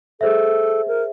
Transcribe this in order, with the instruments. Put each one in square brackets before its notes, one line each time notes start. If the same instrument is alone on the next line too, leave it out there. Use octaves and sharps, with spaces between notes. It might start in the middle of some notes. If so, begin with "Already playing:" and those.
[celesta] G#4 C5 E5 [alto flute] A4
[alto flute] A#4